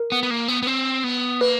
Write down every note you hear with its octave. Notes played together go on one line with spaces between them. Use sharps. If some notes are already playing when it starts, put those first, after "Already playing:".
Already playing: A#4
B3
B3
A#3
B3
B3
C4
B3
A#3 B4